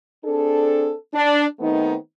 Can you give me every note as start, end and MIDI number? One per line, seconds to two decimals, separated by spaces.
0.24 0.93 60
0.24 0.93 62
0.24 0.93 68
0.24 0.93 69
1.13 1.44 62
1.59 1.95 51
1.59 1.95 57
1.59 1.95 59
1.59 1.95 60
1.59 1.95 63